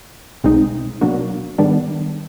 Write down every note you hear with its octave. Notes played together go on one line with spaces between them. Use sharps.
C2 B2 G#3 C4 D#4
B2 F#3 A#3 D4 F#4
G#2 D#3 G3 B3 D4